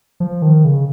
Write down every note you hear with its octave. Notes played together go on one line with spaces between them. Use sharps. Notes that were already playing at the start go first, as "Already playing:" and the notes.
F3
D#3
C#3